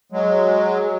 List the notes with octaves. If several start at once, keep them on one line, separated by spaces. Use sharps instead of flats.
F#3 G#3